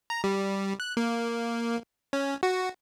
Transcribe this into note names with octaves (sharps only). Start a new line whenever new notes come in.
A#5
G3
F#6
A#3
C#4
F#4